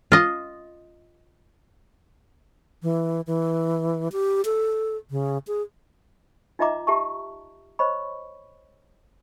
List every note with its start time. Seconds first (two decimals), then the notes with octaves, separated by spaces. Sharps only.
0.12 F4 D#5
2.82 E3
3.27 E3
4.12 G4
4.45 A4
5.11 C#3
5.47 G#4
6.59 D#4 F4 D#5 E5 A#5 D6
6.87 G4 E5 A5 A#5 C#6
7.79 C5 C#5 D#5 B5 C#6